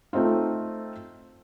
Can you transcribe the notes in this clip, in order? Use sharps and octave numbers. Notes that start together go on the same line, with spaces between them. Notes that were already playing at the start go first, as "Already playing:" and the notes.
A3 C4 D#4 F4